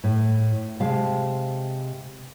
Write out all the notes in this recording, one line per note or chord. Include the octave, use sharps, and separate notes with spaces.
A2
C3 G#3 F5 A5